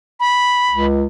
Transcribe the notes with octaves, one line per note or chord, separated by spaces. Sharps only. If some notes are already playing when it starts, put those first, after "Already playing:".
B5
C#2